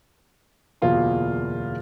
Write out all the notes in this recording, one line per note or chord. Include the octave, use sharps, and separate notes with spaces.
D1 E2 B2 A#3 F4 C6